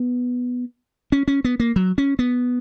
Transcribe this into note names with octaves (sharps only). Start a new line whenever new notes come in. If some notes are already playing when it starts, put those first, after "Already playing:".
Already playing: B3
C#4
C#4
B3
A#3
F#3
C#4
B3